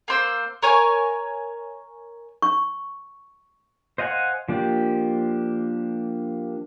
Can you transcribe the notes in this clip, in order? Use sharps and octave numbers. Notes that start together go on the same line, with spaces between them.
A#3 C5 E6
A#4 C#5 G#5
C#6
C5 D#5 F5 F#5 G#5
F3 A#3 D4 G4